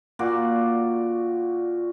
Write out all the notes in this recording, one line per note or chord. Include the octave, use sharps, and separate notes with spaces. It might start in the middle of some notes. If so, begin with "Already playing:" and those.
A#2 F#4 D5 C6